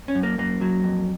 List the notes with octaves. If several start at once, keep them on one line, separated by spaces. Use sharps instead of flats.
C#4
F#2
A#3
F#2 A#3
F#3
F2